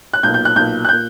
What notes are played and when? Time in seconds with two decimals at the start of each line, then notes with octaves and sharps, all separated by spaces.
0.14 F#6
0.23 B1 A#2 G6
0.34 G6
0.45 F#6
0.56 B1 A#2 G6
0.85 F#6
0.89 A#2 G6